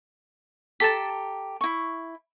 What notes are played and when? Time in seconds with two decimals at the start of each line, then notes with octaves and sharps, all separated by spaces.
0.80 G4 A4 A5 A#5 B6
1.61 E4 C#6